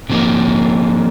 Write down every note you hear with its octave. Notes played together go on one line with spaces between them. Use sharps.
C3 F3 A#3